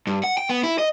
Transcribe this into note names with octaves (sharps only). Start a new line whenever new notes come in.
G2
F#5
G5
B3
E4
D#5